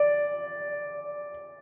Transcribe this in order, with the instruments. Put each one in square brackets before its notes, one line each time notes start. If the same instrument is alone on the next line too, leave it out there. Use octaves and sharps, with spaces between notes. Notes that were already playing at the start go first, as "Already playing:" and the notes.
Already playing: [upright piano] D5